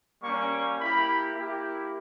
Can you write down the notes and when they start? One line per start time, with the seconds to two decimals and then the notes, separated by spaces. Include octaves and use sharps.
0.22 G3 A#3 C#4 C#6
0.79 A#3 E4 G4 B5
1.35 A#3 E4 G4